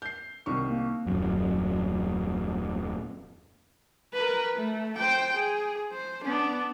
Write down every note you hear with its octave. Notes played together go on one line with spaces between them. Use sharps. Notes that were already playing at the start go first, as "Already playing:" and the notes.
G6 C7
C2 D#3 C#6
A#3
D#1 F#2
A#4 B4
A3
C5 G5
G#4
C5
B3 D4